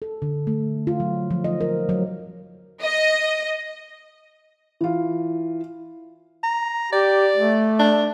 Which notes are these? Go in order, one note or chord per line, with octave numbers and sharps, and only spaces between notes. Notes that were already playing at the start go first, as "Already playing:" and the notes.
A4
D3
A3
F4
F#3
F3
D#5
A#4
F#3
D#5
E3 F4
A#5
G4 D5
A3
D4